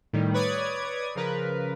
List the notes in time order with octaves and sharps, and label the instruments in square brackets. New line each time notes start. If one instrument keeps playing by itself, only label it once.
[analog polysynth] A2 D#3 G3
B4 C#5 D5 D#6 G#6
C#3 F3 A#4 B4